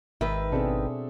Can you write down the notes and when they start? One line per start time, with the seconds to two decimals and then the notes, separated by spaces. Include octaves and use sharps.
0.21 G#1 D#3 B4 E5
0.52 B2 C4 D4 G#4 A4